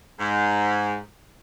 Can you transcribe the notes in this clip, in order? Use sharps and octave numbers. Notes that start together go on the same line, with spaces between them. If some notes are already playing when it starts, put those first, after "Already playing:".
G#2